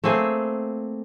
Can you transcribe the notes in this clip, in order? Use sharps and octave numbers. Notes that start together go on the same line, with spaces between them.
A3 A#3 C4 G#4